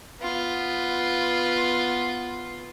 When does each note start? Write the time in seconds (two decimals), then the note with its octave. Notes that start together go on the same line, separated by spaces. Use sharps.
0.21 B3 F4